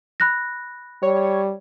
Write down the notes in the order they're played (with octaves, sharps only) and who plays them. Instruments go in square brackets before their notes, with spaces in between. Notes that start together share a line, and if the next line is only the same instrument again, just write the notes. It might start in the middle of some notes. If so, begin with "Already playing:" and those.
[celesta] B5 F#6 A#6
[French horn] G3 [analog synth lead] C#5